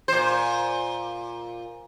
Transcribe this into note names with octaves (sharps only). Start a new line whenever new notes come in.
A#2 C5